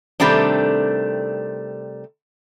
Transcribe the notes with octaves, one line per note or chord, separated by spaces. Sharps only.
C3 D#3 G3 A3 C4 D4